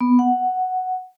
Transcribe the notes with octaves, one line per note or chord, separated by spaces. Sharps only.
B3
F#5